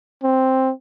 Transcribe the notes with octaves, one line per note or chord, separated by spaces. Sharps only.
C4